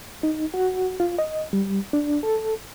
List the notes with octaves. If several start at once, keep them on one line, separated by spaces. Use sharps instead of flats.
D#4
F#4
F4
D#5
G3
D4
A4